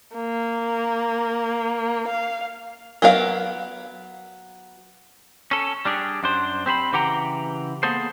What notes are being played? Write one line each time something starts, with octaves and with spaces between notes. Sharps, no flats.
A#3
F5
F#3 B3 A#4 F5
C#4 A4
G3 D4 G4 G#4
F#2 D4 C5
C4 G4 C5 B5
C#3 E3 G4 F#5 G5 A#5
A#3 B3 G#4 A4 C5